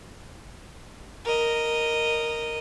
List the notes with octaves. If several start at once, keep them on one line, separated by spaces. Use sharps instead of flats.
A#4 D#5